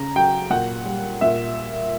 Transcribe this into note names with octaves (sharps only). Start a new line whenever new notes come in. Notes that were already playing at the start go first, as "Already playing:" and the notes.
Already playing: C#3 A#5
F#3 G5
A#2 F#5
G3
A#2 E5